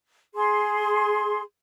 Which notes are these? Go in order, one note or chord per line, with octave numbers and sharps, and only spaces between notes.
G#4 C6